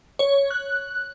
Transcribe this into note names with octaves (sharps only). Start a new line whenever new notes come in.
C#5
F#6